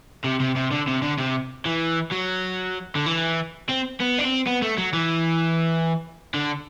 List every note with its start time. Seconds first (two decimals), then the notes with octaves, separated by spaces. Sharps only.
0.24 C3
0.40 C3
0.56 C3
0.71 D3
0.88 C3
1.02 D3
1.18 C3
1.66 E3
2.12 F#3
2.95 D3
3.06 E3
3.69 C4
4.00 B3
4.18 D4
4.24 C4
4.46 B3
4.62 A3
4.78 F#3
4.93 E3
6.34 D3